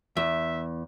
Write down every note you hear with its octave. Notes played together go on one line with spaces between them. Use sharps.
E2 E5